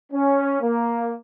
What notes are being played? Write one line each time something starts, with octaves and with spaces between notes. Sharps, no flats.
C#4
A#3